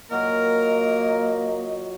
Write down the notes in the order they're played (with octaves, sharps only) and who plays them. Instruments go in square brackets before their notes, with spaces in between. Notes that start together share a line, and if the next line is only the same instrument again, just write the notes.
[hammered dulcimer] A#2 F#3 [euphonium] A#3 [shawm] A#4 [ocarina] D#5